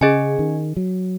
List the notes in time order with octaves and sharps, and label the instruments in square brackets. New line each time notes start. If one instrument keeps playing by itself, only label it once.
[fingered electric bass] C#3 [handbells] C#4 G#4 D#5 G#5
[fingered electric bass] D#3
F#3